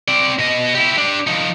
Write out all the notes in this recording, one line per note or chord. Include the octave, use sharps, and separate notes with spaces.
C4 D5
B2 D#5
E4 G4
D4 G4
F3 D#4